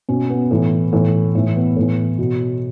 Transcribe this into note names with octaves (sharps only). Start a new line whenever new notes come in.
B2 C#4
B3
A2 E3
A2 E3
A2 E3 A3
B3
A2 E3
B2